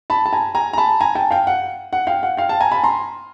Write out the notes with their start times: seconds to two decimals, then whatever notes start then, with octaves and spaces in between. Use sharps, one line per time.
0.10 A5 B5
0.26 A5
0.33 G#5 A#5
0.55 G#5 A#5
0.73 A#5
0.78 A5 B5
1.01 G#5 A#5
1.15 G5 A5
1.31 F5 G5
1.47 F#5
1.93 F#5
2.07 F5 G5
2.23 F#5
2.37 F5 G5
2.49 G5 A5
2.60 G#5 A#5
2.72 A5 B5
2.83 A#5 C6